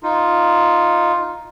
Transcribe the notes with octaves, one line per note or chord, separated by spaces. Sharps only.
D#4 F4